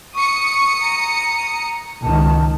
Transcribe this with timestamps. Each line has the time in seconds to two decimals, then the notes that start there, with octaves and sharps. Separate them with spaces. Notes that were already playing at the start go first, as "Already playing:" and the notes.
0.15 C#6 D#6 C#7
0.80 A#5
2.02 C#2 D#3 A5